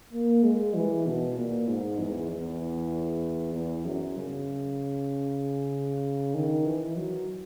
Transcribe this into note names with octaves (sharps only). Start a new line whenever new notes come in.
A#3
G#3
E3
B2
A#2
G#2
E2
E2
E2
F#2
C#3
D#3
E3
F#3